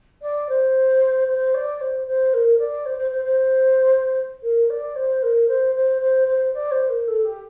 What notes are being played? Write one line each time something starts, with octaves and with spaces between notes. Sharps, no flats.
D5
C5
C5
D5
C5
C5
A#4
D5
C5
C5
C5
C5
A#4
D5
C5
A#4
C5
C5
C5
C5
D5
C5
A#4
A4
G4